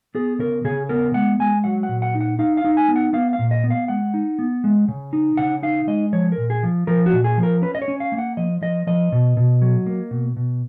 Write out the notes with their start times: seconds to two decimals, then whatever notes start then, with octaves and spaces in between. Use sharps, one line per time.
0.15 B3 G#4
0.39 C#3 A#4
0.64 C#3 G#4
0.89 B3 A#4
1.14 G#3 F#5
1.39 G#3 G#5
1.64 F#3 F#5
1.83 F#5
1.89 A#2
2.02 F#5
2.15 D#4
2.21 F#5
2.39 D#4 F5
2.57 F5
2.65 D#4
2.77 G#5
2.89 B3
2.96 F#5
3.13 B3 F5
3.33 F5
3.39 A#2
3.51 D#5
3.64 B3
3.70 F5
3.88 G#3 F#5
4.14 D#4
4.39 B3
4.64 G#3
4.88 C#3
5.13 D#4
5.37 C#3 F#5
5.63 D#4 F5
5.87 G#3 D#5
6.13 F3 C#5
6.32 A#4
6.38 A#2
6.50 G#4
6.63 F3
6.87 F3 A#4
7.06 F#4
7.12 A#2
7.24 G#4
7.37 F3
7.43 A#4
7.62 C#4 B4
7.75 D#5
7.82 C#5
7.88 C#4
8.00 F5
8.12 A#3
8.19 F#5
8.37 F3 D#5
8.61 F3 D#5
8.87 F3 D#5
9.12 B2
9.37 B2
9.62 F#3
9.86 A#3
10.11 B2
10.37 B2